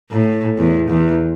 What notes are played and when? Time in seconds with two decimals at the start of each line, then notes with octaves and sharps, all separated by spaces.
0.10 A2
0.58 E2
0.89 E2